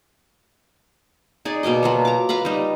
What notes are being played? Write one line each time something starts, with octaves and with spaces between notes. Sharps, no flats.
D#4 G#4 D5 G#5
B2 A#3 D5 D#5
F#3 F4 C#5
A#5 D6
B4 F5 A#5 B5
G3 D#4